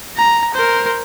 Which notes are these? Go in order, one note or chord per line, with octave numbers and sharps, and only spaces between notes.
A#5
A#4 C5